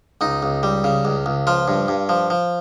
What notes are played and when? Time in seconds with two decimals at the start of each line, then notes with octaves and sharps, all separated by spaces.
0.21 C#2 D#4
0.42 C#2
0.63 G3
0.84 C#3
1.05 C#2
1.26 C#2
1.47 F3 F4
1.68 G2
1.88 G2
2.09 F3
2.30 F3